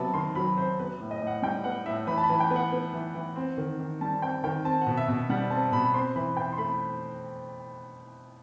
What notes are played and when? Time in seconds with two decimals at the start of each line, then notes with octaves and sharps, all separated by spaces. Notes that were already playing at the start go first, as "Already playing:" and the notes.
Already playing: C3 F#3 B3 A5 B5
0.14 D#3 C6
0.35 F#3 B5
0.57 C3 C5
0.79 B3 B4
1.00 A2
1.11 D#5
1.22 A2
1.27 F#5
1.43 G3 G5
1.64 B3 F#5
1.86 A2 E5
2.07 E3 B5
2.18 A5
2.23 B5
2.29 E3
2.40 G5
2.50 B3
2.56 F#5
2.72 B3
2.93 E3
3.15 E3
3.36 C4
3.58 D#3
3.79 D#3
4.01 G3 A5
4.22 C4 G5
4.44 D#3 G5
4.65 C4 A5
4.81 F#5
4.87 B2
4.97 E5
5.08 B2
5.30 G3 F#5
5.50 C4 A5
5.72 B2 B5
5.94 C4 C6
6.16 E3 B5
6.36 E3 G5
6.53 C6
6.58 A3 B5